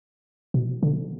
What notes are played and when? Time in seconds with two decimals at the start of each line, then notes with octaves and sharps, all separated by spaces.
0.54 B2
0.83 D3